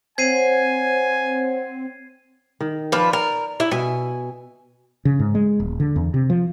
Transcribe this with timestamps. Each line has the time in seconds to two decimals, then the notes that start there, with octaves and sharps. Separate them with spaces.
0.18 C4 C5 C#5 F#5 G#5 G#6 C7 D#7
2.60 D#3
2.92 F3 B4 D5
3.13 A#4
3.60 E4
3.71 B2 E5 G#5
5.05 C#3
5.19 G#2
5.35 G#3
5.60 D#1
5.80 D3
5.96 E2
6.14 C3
6.30 F3